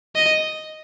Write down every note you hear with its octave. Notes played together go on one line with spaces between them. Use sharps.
D#5